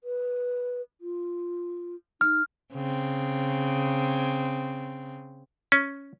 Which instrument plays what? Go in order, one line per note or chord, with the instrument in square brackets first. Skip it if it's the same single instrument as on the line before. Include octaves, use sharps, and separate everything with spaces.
[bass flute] B4
F4
[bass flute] D#4 [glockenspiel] F6
[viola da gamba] C#3 C4
[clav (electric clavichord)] C#4